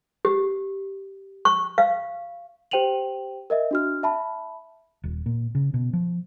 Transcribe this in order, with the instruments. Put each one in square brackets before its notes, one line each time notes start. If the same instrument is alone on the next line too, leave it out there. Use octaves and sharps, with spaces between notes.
[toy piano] G4
C#6
F5
[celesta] G4 C5 G5 D#7 F7 F#7
A#4 D#5 E5
D4 F#4 F6
E5 A5 B5
[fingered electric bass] D#1
A#2
C#3
B2
F3